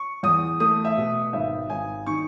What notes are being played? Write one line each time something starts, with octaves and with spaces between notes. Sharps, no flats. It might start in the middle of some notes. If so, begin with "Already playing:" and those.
Already playing: C#6
E2 D#6
A3 D#6
E5
B2
G#1 E5
G#1 G#5
D#3 C#6